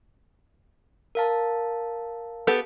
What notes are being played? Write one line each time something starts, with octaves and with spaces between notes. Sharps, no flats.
A#4 F5 A5
B3 G4 A4